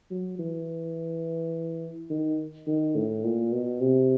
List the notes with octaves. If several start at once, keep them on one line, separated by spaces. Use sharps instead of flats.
F#3
E3
D#3
D#3
A2
A#2
B2
C3